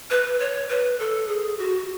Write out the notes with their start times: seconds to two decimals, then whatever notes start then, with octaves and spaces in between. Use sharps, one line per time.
0.10 B4
0.40 C#5
0.69 B4
1.00 A4
1.28 G#4
1.59 F#4